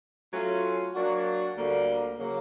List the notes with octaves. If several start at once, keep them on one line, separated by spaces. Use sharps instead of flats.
F#3 A3 C#4 F4
F#3 A#3 D4 F#4
D2 D3 G3 A#3
C#3 F#3 A#3